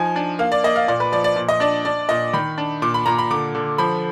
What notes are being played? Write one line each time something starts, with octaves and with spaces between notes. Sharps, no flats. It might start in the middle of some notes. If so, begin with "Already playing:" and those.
Already playing: F3 D#4 G#5
D4
A#3 F5
D5
A#3 D#5
F5
A#2 D5
B4
F3 D5
D5
A#2
D#5
D4 D5
D4 D5
A#2 D#5
D#3 B5
D4
A#2 D6
B5
A#2 A#5
B5
D3 D6
D3
F3 B5